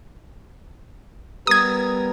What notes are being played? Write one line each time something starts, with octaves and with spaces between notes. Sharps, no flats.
G3 B3 A#4 D#6 G#6